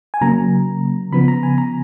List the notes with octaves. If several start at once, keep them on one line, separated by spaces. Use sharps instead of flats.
G#5
C#3 F#3 A#3 A#5
C#3 F3 B3 B5
A#5
G#5
A#5